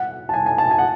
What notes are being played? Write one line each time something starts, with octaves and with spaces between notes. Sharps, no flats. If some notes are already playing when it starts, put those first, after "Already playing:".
Already playing: F#5
A5
G#5
G#5
A5
G#5
F#5